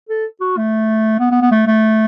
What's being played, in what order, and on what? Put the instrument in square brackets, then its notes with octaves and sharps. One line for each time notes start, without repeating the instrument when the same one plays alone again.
[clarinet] A4
F#4
A3
B3
B3
B3
A3
A3